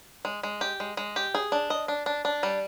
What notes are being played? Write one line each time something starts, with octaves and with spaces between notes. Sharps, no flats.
G#3
G#3
G4
G#3
G#3
G4
G#4
D4
D#5
D4
D4
D4
G3